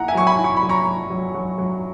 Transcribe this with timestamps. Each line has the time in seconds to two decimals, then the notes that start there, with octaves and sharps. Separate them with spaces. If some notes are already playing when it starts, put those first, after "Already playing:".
Already playing: A#3 E4 F#5 A#5
0.08 E5 G#5
0.14 F#3 C#6
0.27 G#5 B5
0.39 E4
0.44 C#6
0.57 B5
0.63 F#3
0.69 A#5 C#6
0.87 F#3
1.10 F#3
1.34 F#3
1.58 F#3